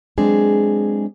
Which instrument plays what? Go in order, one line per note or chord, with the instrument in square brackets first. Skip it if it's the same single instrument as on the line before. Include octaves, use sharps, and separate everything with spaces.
[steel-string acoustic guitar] E3 F#3 G#3 C4 D4 G#4